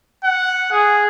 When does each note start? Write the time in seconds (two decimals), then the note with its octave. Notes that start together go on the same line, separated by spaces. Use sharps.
0.25 F#5
0.72 G#4